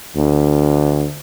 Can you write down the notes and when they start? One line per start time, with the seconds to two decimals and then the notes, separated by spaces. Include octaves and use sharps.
0.16 D2